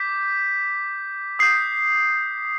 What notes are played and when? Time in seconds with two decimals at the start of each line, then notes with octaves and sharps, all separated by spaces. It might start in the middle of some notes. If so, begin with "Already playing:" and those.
Already playing: D6 G6 B6
1.39 D#6 G6 C7